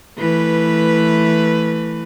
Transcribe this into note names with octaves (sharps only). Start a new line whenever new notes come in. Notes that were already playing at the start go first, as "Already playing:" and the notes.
E3 A3 B4